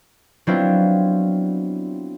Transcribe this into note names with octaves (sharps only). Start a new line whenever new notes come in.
F#3 B3 C4 D4 E4 F4